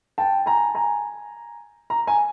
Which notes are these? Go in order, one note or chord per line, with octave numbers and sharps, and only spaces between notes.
G5 A5
G#5 A#5
G#5 A#5
A#5
G#5 A#5